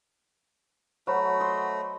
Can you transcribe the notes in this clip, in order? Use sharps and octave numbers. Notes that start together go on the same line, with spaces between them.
F#3 A3 F#4 C5 B5
D#5 C6